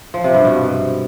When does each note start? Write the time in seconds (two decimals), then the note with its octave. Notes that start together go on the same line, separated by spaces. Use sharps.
0.14 F3
0.24 C3
0.35 G2
0.45 B2